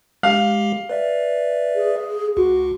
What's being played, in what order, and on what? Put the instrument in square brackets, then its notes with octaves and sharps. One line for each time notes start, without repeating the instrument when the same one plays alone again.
[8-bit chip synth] G#3 G4 [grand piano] F5
[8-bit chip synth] B4 D5 E5
[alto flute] G#4
[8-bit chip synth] C#2 [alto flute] F#4